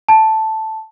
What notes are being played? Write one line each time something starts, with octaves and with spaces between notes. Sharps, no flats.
A5